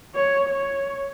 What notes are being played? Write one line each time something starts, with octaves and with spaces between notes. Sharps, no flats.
C#5
C#5